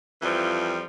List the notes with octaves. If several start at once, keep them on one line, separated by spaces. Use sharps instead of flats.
F2 E3 F3 G3